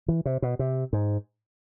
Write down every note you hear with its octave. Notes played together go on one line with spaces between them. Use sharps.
E3
C3
B2
C3
G#2